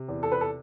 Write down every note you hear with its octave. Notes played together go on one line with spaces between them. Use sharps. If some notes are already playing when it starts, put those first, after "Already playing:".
Already playing: C3
E2
A4
B4
A4